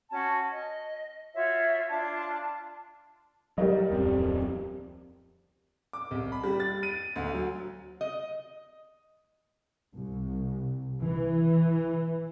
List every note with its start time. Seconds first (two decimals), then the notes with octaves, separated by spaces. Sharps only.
0.10 C#4 F#4 A5
0.51 D#5
1.34 F4 F#4 C#5 E5
1.90 D4 F4 A5
3.58 F#3 G3 A#4 D#5
3.90 D1 F2 C4
5.93 D6
6.11 C2
6.32 B5
6.44 G3
6.60 A6
6.83 D#7
7.16 D2
7.34 F#3
8.01 D#5
9.95 C2
11.01 E3